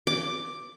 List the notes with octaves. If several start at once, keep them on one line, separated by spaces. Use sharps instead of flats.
D6